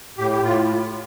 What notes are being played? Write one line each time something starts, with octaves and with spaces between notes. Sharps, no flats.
A2 G4
G4
A2 F4